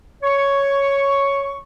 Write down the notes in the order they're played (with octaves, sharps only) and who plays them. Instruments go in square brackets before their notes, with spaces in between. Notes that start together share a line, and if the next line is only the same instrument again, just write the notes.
[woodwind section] C#5 C#6